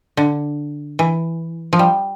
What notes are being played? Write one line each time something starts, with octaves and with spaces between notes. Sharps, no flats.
D3
E3
F3
G3